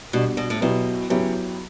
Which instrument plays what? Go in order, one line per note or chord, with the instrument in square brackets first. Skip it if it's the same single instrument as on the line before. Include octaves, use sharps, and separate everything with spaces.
[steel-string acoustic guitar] B2 [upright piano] G3 D4 F#4
[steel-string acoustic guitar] B2
A2
[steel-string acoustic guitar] B2 [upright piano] F#3 B3 E4 G4
[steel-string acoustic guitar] C#3 [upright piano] F#3 B3 E4 G4